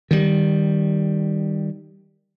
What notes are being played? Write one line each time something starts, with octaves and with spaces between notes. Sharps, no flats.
D#3 G3